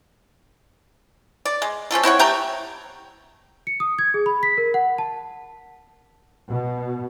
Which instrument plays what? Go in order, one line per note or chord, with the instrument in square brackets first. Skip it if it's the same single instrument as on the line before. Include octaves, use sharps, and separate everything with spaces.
[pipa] D5
G#3
F3 C#4 F4 A4
C4 E4 C#5 F#5
A3 G4 G5 A#5
[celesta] C#7
D#6
G#6
G#4
B5
B6
A#4
F#5
A5
[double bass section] B2